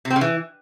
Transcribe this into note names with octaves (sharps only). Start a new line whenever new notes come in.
C3
C4
C#3
E3